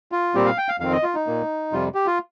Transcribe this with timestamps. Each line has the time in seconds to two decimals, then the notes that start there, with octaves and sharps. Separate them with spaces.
0.12 F4
0.35 A#2 G3 C4 G4
0.46 F5
0.58 G5
0.69 F5
0.80 F2 D#3 C4 F5
0.92 D#5
1.03 F4
1.15 D#4
1.27 A#2 A#3
1.72 F2 C3 G3 F4
1.95 G4
2.06 F4